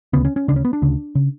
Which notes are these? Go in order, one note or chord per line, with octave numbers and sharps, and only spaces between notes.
D2 C#3 B3
C#4
C#4
D2 C#3 D4
C#4
B3
D4
D2 C#3
C#3